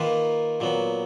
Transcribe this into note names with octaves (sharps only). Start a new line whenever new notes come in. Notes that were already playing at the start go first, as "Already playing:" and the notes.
Already playing: D#3 A#3 F4 B4
A#2 F#3 B3